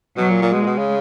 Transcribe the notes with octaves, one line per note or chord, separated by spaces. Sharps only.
B2 F#3
A#2
A#2
B2 G#3
A#2
B2
C#3